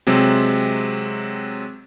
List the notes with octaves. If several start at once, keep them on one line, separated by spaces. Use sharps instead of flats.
C3 F#3 G#3 C4